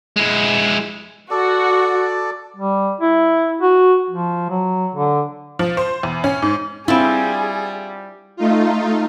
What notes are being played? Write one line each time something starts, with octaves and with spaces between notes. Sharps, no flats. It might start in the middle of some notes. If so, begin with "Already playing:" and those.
G#3 E4
F#4 A4 D5
G3
E4
F#4
F3
F#3
D3
F3
C5
E2
C#4
G#2
G3 C4 E4 F4 G#4
A3 D#4 F4